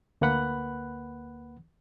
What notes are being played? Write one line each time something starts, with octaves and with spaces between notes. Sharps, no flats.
D2 A#3 B4 F#5 B5 F#6